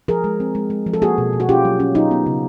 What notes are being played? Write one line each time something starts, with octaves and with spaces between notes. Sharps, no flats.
F3 G#4 A#4
G#3
C4
G#3
G#3
F3
A4
A#3 F#4 G#4
B2
B2
F#4
C#4 F4 G4
F#3
C#4
F#3 D#4 F4
B3
C#3